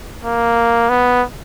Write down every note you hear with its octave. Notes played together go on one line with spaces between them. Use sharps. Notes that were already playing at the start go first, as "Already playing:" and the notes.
A#3
B3